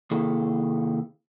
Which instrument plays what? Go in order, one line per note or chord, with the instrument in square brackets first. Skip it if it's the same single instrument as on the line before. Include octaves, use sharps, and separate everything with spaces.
[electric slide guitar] C3 D#3 A#3 E4 G#4 A4